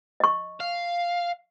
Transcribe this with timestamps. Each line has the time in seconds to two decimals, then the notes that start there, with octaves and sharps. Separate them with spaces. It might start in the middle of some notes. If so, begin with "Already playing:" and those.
0.20 D#5 C#6
0.60 F5